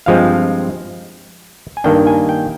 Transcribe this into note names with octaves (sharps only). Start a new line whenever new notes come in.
G2 F3 G#3 C4 F5
G#5
G2 D#3 A#3 D4 G5
G#5
G5